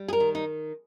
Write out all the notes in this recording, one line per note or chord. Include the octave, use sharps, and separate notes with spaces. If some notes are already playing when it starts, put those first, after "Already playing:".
Already playing: G3
G#4
A#4
D#3
D#4